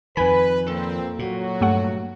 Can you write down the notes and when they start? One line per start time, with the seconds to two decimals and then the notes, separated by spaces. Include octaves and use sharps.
0.17 F2 D#3 B4 G#5 B5
0.68 A#2 A#3 C4 A4
1.19 A#2 F#3 F#4
1.61 G2 A3 F#5